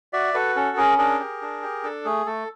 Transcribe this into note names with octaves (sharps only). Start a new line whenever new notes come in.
F#4 D5 E5
F#4 A4 B4
C#4 A4
C#4 G#4 A#4
D4 G#4 A#4
G4
D4
G4
D4 A4
A3 G#4
A3 A4